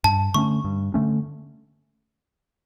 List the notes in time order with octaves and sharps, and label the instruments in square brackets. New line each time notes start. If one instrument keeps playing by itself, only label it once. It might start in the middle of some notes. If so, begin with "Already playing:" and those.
[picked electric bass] G2 [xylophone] A5
[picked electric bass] D3 A3 C#4 [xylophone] C#6
[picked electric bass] G2
D3 A3 C#4